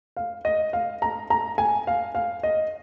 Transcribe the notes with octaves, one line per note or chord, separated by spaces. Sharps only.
F5
D#5
F5
A#5
A#5
G#5
F5
F5
D#5